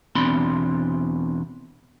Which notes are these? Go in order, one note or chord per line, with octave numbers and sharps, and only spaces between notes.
E2 B2 C4 D4 B5 C6